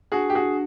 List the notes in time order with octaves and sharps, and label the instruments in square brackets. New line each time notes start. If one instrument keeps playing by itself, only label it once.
[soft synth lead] D4 [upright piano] F#4 G#4
[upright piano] G4
F#4 G#4